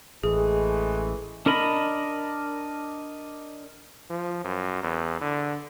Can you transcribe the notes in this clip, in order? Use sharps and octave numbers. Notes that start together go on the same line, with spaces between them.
A1 E3 G#3 A3 G#4
D4 A#4 D#5 B5
F3
F#2
E2
D3